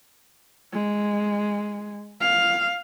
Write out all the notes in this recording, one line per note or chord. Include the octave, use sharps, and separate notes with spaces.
G#3
F5